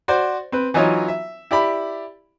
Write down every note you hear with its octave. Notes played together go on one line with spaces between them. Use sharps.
F#4 C5 D5
C4 B4
E3 F#3 D#4 F4 C#5 D#5
E5
E4 G4 D5 B5